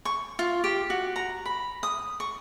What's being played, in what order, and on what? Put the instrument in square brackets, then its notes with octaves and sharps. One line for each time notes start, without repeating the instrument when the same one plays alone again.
[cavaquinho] C#6
F4
G4
F#4
A#5
B5
D#6
C#6